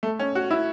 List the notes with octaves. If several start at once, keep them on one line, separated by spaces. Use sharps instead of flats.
A3
C#4
F#4
E4